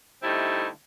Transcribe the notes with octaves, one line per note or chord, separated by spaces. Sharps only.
D3 G3 A3 C4 D#4 E4